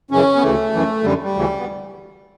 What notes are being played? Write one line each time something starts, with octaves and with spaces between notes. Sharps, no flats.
F#2 C#3 E3 C#4
B3
D2 C#3 E3 A3
F#2 E3
F#2 D3 G3
G3
D2 C#3 E3
B3